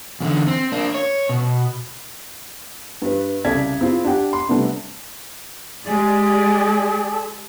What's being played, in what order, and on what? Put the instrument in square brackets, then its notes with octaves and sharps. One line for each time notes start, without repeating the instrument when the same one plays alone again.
[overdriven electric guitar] E2 D3
C4
A#3 D4
C#5
B2
[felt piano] G2 B4
C2 C#3 A4 D5 G#6 B6
C4 E4 F4 G#4
D4 G4 F#5 G5
C6
C3 G3 A3 B3 D4
[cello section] G#3 G4 D5 [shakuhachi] G#4